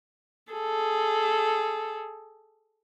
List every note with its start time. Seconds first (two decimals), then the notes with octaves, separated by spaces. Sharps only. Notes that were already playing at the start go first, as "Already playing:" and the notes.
0.52 G#4 A4